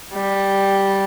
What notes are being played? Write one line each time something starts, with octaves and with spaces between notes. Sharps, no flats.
G3